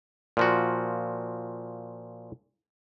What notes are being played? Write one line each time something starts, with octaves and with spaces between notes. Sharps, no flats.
A#2 F3 F#4